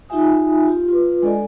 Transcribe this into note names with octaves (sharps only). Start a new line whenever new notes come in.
D#4 F4 G4 E5 G#5 D#6
F4 G4
F4 B4
G#3 D4 A4 D5 D#5 G#5